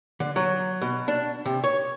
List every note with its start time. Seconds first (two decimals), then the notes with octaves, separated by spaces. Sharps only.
0.20 D3
0.36 F#3
0.82 B2
1.08 D4
1.46 C3
1.64 C#5